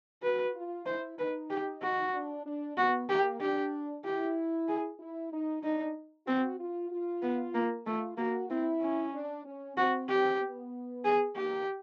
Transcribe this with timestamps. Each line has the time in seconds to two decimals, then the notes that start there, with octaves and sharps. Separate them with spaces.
0.23 F#4 B4
0.55 F4
0.86 E4 C5
1.18 D#4 B4
1.50 G4
1.82 F#4
2.14 D4
2.46 D4
2.77 B3 F#4
3.09 A#3 G4
3.41 D4 G4
4.05 E4 G4
4.68 G#4
5.00 E4
5.32 D#4
5.63 D4 D#4
6.26 C4 F#4
6.59 F4
6.90 F4
7.22 B3
7.54 A#3
7.86 A3 F4
8.18 A#3 F#4
8.50 C4 E4
8.82 C#4
9.13 D4
9.44 C#4
9.77 C4 F#4
10.09 G4
10.40 B3
11.04 G#4
11.36 A#3 G4